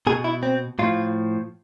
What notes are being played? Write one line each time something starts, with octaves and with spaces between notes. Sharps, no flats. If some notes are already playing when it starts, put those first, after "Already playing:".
B2 G#4
E4
C4
A2 F3 F4